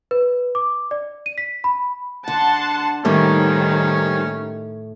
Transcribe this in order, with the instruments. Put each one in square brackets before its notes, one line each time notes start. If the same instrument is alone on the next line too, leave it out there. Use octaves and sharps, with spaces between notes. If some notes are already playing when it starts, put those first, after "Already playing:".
[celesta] B4
D6
D5
D#7
B6
B5
[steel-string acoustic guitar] D3 [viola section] F#5 A5 C6
[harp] A2 [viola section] D#3 [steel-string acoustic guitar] G3 A#3 C4 [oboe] C#4